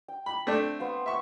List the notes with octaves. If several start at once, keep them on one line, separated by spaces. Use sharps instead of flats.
G5
B5
A3 C4 D4
B3 C5 F5
E5 C#6